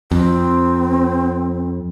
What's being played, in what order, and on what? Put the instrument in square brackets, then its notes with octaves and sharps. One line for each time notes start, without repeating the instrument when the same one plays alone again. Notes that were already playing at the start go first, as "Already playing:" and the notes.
[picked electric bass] F2 [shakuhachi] C4